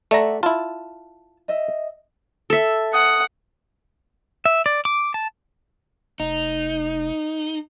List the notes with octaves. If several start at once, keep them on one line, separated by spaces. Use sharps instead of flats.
A3 D5 E5 F#5 A#5
E4 F4 A5
D#5 E5
A4 E5
F#5 D#6
E5
D5
D6
A5
F1 D#4